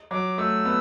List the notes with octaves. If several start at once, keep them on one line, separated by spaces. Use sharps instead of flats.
F#3 D6
A3 E6
B3